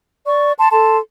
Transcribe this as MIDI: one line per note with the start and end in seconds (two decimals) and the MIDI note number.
0.25 0.53 74
0.25 0.53 85
0.58 0.69 81
0.58 0.69 84
0.71 0.98 69
0.71 0.98 81
0.71 0.98 84